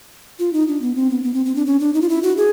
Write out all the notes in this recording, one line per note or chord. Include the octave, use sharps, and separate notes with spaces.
F4
D#4
D4
B3
C4
B3
B3
C4
C4
D4
C#4
D4
D#4
F4
E4
F#4
G#4